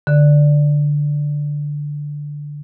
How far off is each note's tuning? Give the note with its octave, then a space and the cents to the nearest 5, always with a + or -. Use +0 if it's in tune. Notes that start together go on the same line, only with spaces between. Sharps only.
D3 +0 D5 +0